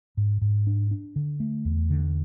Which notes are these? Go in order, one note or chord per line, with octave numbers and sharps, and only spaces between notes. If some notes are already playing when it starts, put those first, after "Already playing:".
G#2
G#2
D4
D4
D3
A3
E2
D3